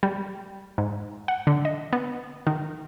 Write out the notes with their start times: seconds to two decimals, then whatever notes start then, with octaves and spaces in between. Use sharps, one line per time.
0.03 G3
0.78 G#2
1.28 F#5
1.47 D3
1.65 D#5
1.93 B3
2.47 D#3